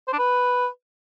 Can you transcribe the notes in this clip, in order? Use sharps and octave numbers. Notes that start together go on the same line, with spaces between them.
C5
D4
B4